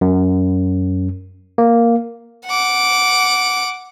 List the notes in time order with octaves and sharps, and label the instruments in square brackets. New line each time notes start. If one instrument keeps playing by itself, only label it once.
[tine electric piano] F#2
A#3
[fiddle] F#5 D6